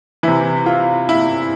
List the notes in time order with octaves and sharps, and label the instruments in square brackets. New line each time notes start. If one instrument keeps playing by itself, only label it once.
[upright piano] C3 E3 E4
F4
E4